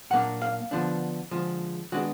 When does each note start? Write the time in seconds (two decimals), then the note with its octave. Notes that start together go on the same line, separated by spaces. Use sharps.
0.10 A#2 F#3 A#3 D4 F#5
0.42 F5
0.71 D3 F3 B3 D4
1.31 D3 F3 G#3
1.92 D#3 G#3 B3 D4 F#4